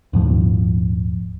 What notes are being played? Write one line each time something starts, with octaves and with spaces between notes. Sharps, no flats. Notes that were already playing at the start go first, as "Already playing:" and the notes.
D#1 G#2 F3